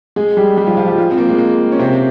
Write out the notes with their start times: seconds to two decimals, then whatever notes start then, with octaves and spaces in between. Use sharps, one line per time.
0.16 G#3 G#4
0.37 G3 G4
0.57 G3 G4
0.67 F3 F4
0.77 F3 F4
0.88 G3 G4
0.98 F3 F4
1.11 C4
1.18 A#3
1.29 G#3
1.38 A#3
1.72 C#4
1.79 C3 C4